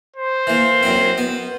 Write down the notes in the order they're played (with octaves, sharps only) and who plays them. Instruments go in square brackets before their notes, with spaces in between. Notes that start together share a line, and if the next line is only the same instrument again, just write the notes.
[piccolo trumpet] C5
[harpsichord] E3 A#3
F#2 F#3 C4
B3